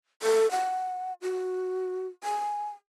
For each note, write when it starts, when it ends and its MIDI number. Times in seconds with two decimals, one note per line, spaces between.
0.23 0.49 69
0.51 1.13 78
1.22 2.07 66
2.23 2.69 80